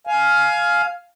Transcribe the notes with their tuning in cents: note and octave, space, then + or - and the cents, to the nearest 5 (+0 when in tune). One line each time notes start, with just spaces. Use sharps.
F5 +0 G#5 +20